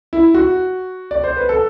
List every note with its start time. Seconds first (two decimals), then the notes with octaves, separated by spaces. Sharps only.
0.13 E4
0.34 F#4
1.11 D5
1.24 C5
1.37 B4
1.49 A4